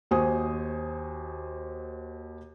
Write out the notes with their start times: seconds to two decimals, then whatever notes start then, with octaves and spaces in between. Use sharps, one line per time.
0.11 D#2 F#4 C5 G#5 D#6